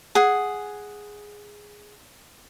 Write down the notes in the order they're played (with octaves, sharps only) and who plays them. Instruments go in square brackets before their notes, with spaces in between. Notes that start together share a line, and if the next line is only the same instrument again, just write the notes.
[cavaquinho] G#4 F#5